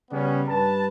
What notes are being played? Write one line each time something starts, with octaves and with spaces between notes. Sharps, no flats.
C#3 G3 B3 C#4
G2 B4 A5